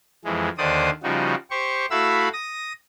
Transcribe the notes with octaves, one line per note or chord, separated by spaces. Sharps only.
F2 E3 G#3
D#2 D3 D#3 C5 D5 D#6
C#3 F3 G3 D#4 F#4
G4 C5 C#6
A3 E4 F#4 F5 B5 E6
D#6 A#6